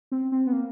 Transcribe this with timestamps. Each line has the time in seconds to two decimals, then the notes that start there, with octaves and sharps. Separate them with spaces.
0.11 C4
0.32 C4
0.47 B3
0.53 A#3